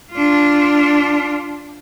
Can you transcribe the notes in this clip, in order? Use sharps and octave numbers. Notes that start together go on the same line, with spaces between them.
D4 F4